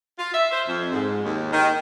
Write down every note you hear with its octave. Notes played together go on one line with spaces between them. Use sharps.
F4
E5
C5
F2
G#2
D#2
D#3